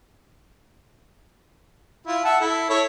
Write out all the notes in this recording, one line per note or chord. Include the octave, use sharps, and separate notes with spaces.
E4 F4
E5 F#5 A5
E4 A4
E4 A4 C#5